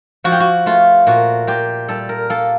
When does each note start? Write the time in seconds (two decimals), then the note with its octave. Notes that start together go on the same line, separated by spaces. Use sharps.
0.24 F3 F#4
0.32 G4
0.40 F#4
0.66 A3 F4
1.07 A#2 F#4
1.47 A#2 G4
1.89 G3 A4
2.09 A#4
2.30 A#3 A4